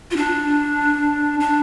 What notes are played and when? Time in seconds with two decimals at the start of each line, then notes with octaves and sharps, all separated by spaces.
0.11 F4
0.16 D4
1.40 D4